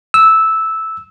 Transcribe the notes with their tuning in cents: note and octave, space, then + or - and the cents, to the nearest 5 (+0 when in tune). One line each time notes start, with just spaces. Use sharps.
E6 -10